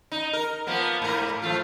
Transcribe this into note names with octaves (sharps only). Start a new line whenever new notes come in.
D#4
A#4
F3 A#3 B3
G#2 A#4
F3 A3 F4